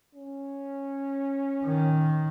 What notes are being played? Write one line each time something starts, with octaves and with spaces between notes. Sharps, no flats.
C#4
D#3